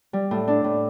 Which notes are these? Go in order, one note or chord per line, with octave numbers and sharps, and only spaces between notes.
G3
A2
D4
A2